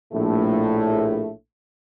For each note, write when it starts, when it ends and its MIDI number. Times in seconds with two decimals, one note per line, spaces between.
0.14 1.30 34
0.14 1.30 45
0.14 1.30 57